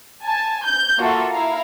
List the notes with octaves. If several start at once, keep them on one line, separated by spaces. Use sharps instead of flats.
G#5 A5
G6
A#3 F4 F#4 A4 E5
E4 E5 F5 A#5